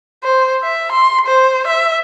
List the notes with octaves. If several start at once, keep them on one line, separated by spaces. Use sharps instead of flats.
C5
E5
C6
C5
E5